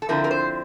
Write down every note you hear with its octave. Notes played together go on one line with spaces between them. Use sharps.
A4
D3 F3 C4 E4 A#4
A#4
C5